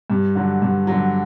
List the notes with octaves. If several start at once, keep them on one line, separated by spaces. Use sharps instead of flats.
G2
D3 F#3
G2
D3 F#3